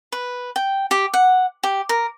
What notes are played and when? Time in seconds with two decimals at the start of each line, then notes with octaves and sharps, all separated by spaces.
0.12 B4
0.56 G5
0.91 G4
1.14 F#5
1.63 G4
1.89 A#4